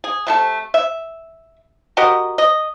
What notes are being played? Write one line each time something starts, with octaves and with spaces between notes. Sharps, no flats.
G#4
C3 A3 A4
E5
F#4 G4 A#4 D#5
D#5